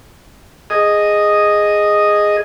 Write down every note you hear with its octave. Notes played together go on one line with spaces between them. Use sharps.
G#4 D#5